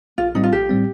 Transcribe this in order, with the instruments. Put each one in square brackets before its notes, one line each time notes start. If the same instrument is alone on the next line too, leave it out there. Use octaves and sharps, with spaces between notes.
[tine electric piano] A#1 [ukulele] F4
[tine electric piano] A2 G3 C4 [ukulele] D#4
[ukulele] F4
[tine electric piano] A#1 [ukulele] G4
[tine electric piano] A2 G3 C4